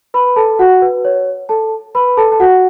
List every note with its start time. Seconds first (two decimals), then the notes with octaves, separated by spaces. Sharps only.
0.14 B4 B5
0.36 A4 A5
0.59 F#4 F#5
0.82 B4
1.05 C#5
1.49 A4 A5
1.95 B4 B5
2.17 A4 A5
2.32 A5
2.40 F#4 F#5